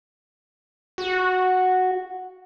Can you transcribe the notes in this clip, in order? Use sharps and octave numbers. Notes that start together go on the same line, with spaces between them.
F#4